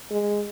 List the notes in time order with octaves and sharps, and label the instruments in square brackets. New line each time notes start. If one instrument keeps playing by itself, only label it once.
[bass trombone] G#3